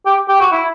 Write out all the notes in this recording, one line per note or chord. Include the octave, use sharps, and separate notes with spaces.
G4
G4
F#4
E4